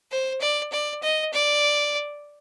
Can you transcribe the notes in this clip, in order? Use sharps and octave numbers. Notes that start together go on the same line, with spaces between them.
C5
D5
D5
D#5
D5